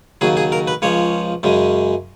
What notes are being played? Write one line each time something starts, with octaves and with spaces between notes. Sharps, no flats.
D#2 C#3 F#3 G#4
G#4
A#4
B4
C#2 C#3 F3 C#5
F#2 C#3 G#3